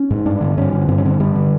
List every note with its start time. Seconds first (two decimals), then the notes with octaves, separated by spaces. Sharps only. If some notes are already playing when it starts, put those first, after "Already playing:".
Already playing: C#4
0.10 G#2
0.25 G2 D4
0.41 D3
0.57 G2 C#4
0.72 D3
0.88 G2 C4
0.98 C#4
1.05 D3 C4
1.20 G2 G3
1.35 D3